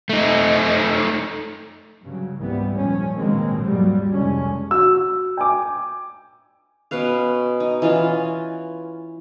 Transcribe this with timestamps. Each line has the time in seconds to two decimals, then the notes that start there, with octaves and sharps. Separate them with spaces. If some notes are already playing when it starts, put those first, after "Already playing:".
0.09 A3 D#4
2.02 G2 C#3 F#3
2.38 C#2 G#2 E3 G3 B3
2.77 D#2 A#2 F3 C#4
3.17 A1 B2 D#3 G#3 A#3 C4
3.63 D#2 G#2 F#3 G3
4.11 C2 F2 D3 G#3 C#4
4.71 F#4 E6
5.37 G5 G#5 D6
6.91 B2 C#4 B4 F5
7.60 D#4
7.82 E3 C#4 F4